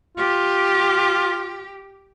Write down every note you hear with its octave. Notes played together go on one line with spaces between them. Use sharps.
F4 G4